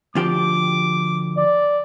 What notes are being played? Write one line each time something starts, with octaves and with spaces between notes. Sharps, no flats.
D2 F3 G4 D6
D5